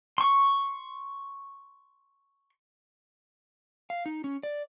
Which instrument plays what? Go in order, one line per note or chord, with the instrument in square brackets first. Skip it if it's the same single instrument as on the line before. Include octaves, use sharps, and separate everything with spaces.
[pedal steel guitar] C6 C#6
[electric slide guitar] F5
D#4
C#4
D5